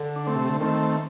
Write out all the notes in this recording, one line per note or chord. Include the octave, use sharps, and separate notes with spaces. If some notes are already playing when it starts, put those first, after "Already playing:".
Already playing: D3
D4
A3 C4
C3
D3
D#3 A3 C4